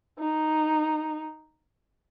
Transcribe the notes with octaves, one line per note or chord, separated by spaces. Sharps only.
D#4